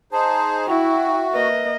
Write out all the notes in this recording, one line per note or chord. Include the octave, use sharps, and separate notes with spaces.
D#4 G#4 C5 A5
E4 F#4 E5 G5
A#3 B4 D#5